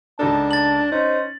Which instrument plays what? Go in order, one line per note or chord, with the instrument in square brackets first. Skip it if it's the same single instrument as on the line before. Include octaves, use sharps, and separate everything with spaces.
[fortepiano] C#2 D#4 A4 [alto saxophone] D4 [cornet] A5
[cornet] A5 [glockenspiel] A6 F#7
[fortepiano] C#4 [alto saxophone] D#4 [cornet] C5